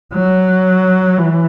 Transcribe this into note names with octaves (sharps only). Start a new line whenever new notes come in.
F#3
E3